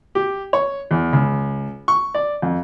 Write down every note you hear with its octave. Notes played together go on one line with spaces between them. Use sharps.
G4
C#5
E2
C#2
C#6
D5
F2